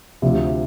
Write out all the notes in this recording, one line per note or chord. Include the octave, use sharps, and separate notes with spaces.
D2 C3 F3